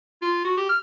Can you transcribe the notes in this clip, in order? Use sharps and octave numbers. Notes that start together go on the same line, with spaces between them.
F4
F#4
G4
F6